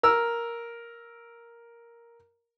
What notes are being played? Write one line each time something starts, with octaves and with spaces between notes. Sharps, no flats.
A#4 E6